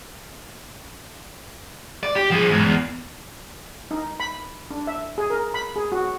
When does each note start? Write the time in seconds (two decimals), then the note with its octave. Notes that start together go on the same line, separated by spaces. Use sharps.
2.03 D5
2.16 G4
2.31 F3 G#4
2.51 E2 G#2
2.63 E2
3.91 D#4
4.20 B5
4.70 D4
4.87 E5
5.18 G#4
5.30 A#4
5.54 B5
5.76 G#4
5.92 F#4